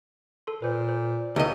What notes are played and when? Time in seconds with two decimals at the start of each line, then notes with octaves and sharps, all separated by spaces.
0.47 A4 C6
0.62 A#2 B4 C5
0.89 C5
1.36 C#2 C#3 D#4 G4 A4 D#5